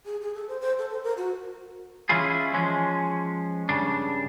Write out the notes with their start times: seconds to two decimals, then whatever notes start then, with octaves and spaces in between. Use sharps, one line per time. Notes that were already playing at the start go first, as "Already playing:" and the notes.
0.05 G#4
0.21 G#4
0.34 A4
0.48 C5
0.60 C5
0.79 A4
0.91 C5
1.03 A#4
1.17 F#4
2.09 E3 G#3 C#4 E4 F4 G#4
2.54 F3 G#3 C#4
3.69 G2 C#3 D4